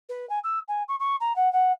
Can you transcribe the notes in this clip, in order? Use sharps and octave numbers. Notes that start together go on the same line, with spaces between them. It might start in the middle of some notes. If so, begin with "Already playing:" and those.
B4
G#5
E6
G#5
C#6
C#6
A#5
F#5
F#5